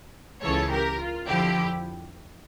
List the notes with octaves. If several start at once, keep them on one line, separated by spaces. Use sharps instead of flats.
C#2 C#3 E3 A4 C#5
G4 A#4
F4
F2 D3 F3 E4 G4